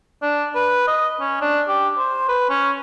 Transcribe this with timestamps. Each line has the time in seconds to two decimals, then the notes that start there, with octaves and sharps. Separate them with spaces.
0.22 D4
0.55 B4
0.87 D#5
1.20 C#4
1.41 D4
1.69 G4
1.98 C5
2.29 B4
2.50 C#4